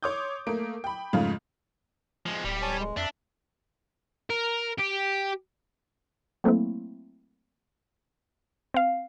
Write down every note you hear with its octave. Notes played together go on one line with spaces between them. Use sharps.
C#5 C6 D6 D#6 G6
A3 A#3 A#4 D7
G5 B5
F2 G#2 C#3 A3 F4
F3 G#3
D1 G3 G4
C#5 G#5 A5
G#3
F2 D4 E5
A#4
G4
F#3 A3 A#3 C4 E4
C4 F5